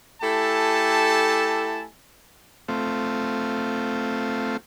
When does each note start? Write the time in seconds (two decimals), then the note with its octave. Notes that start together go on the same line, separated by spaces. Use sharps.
0.22 A3 E4 G4 A4 G#5 A5
2.68 A3 C4 F4